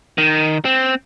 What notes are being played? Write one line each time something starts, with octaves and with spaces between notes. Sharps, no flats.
D#3
C4